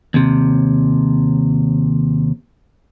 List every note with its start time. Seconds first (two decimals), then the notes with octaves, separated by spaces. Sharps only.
0.14 D#2 C3